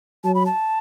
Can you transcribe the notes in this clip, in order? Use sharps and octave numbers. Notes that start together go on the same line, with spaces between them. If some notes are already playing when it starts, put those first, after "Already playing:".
F#3 A5
B5
A5